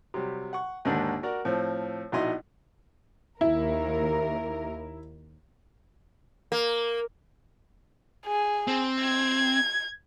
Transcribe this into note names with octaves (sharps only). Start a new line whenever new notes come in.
C3 F#3 G3
F#5 C#6
D#2 G#2 D3 A#3 D4
F#4 A#4 D5
A2 F3 C4
A#1 B2 D#4 E4 D#5 C6
D#2 E4 A#4
A#3
G#4
C4
G#6